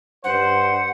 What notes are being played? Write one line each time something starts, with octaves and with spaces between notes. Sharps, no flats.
G2 C5 F#5